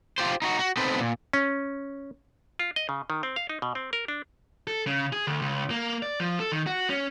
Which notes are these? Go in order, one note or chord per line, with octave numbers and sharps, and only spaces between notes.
F4 G4 C5
D#4 E4 F#4
F#4
B3 C4 D#4 A4 B4 C5
A#2
C#4
F4
D#5
C#3
D#3
C4
F5
D#4
B2
C4
A#4
D4
A4
C#3
G#4
D2
C#2
A#3
D5
F3
A4
D#3
F#4
C#4